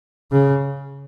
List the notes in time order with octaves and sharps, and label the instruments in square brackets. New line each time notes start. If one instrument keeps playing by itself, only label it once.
[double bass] C#3